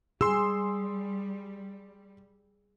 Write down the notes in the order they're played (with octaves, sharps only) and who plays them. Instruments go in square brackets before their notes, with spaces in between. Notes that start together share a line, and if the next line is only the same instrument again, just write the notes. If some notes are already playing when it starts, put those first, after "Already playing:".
[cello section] G3 [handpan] G#4 [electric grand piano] C6 E6